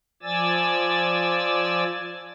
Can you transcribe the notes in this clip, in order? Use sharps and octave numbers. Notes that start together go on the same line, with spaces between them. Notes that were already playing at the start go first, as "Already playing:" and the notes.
F3 D5 G#5 E6 A6